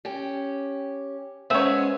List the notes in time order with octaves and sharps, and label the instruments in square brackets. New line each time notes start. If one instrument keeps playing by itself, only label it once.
[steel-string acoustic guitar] C#4 G4
[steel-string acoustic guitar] G#3 B3 C#4 [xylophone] C5 E6 E7 [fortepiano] C#5 E5